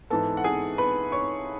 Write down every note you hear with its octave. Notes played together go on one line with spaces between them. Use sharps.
G#2 E3 B3 A4 A5
F#5
G#4 G#5
B4 B5
C#5 C#6